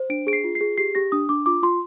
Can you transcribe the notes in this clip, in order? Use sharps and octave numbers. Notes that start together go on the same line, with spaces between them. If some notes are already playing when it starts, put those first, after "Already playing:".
Already playing: C5
D4 D7
G#4 D7
C7
F4
C7
G#4
G4 C7
G4 A#6
D4 D#6
D4 D6
F4 D6
F4 C6